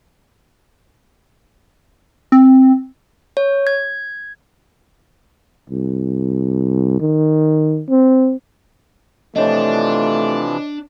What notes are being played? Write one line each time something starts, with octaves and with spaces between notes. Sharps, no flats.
C4
C#5
G#6
C2
D#3
C4
C3 E3 F3 A3 D4 C#5 D#5